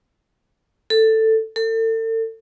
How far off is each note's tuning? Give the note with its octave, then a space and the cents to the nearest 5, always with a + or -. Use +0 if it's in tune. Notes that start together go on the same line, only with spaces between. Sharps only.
A4 +10
A4 +35